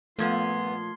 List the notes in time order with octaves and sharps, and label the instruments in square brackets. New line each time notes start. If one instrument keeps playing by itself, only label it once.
[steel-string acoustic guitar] G2 B3 [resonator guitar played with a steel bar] A#2 F3 [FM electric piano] A3 G#6 [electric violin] C6